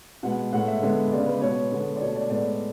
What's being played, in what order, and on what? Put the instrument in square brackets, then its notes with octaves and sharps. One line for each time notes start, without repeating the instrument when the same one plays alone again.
[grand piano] B2 G#3 B3 F#5
A2 G#3 B3 F#5
E5
D3 G#3 B3
C#3 G#3 B3 D5
B4
B2 G#3 B3 C#5
D3 G#3 B3
D5
B2 A3 C#5
D5
A2 G#3 B3 D5